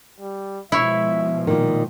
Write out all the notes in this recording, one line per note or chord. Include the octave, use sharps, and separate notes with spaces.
G3
B2 F3 G#3 E4 C#5 E5
A#2 D#3